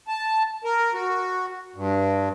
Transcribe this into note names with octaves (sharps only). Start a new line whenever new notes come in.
A5
A#4
F#4
G2